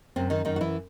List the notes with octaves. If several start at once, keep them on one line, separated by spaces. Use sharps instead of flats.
F#2 C3 C4
D#3 D#4
F#2 D#3 D#4
F#4
E3 E4